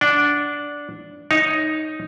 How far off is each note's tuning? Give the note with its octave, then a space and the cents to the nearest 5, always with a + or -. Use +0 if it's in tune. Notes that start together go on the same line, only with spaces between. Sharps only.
D4 -10 F#5 +0
D#4 +0 C#5 +0